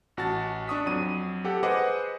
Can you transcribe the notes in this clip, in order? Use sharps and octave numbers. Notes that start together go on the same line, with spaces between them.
A1 F#4 A5 A6
D4 C#6 D#6 B6
F2 F#3 D#7
G4 A4 F#5
G#4 B4 C5 D#5 F#5 D6